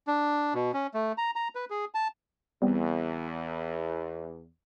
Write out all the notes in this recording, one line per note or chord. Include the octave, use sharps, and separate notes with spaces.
D4
B2
C#4
A3
A#5
A#5
B4
G#4
A5
E2 G3 B3 C4